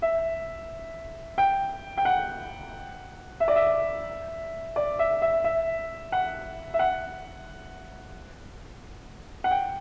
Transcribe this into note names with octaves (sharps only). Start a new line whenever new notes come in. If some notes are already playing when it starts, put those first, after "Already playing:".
E5
G5
G5
F#5
E5
D5
E5
D5
E5
E5
E5
F#5
E5
F#5
F#5
G5